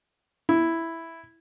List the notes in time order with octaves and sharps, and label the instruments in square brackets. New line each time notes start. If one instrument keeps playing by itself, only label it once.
[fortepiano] E4